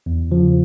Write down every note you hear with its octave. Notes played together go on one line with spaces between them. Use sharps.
E2
C#3 F3